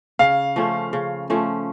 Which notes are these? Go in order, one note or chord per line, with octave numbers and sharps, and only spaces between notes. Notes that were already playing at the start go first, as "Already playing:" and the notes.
C#3 F5
F3 A3 C#4
C#3
F3 A3 C#4